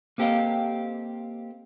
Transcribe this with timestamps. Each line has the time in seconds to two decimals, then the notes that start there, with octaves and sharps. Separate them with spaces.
0.18 A#3 C4 G4 A4 D#5 F5